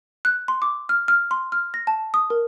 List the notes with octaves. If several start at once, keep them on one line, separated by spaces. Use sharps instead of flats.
F#6
C6
D6
F6
F6
C6
F6
A#6
A5
D#6
A#4